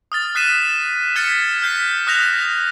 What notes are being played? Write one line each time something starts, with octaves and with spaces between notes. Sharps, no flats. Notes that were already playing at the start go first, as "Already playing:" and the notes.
D#6 F6 A6
D#6 F#6 B6 C7 D#7 E7
F6 G#6 A6 B6 C#7 E7
F6 G6 B6 C7
D#6 F#6 A#6 F7
A#6